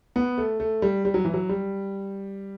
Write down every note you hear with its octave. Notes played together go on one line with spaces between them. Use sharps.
B3
A3
A3
G3
G3
F#3
E3
F#3
G3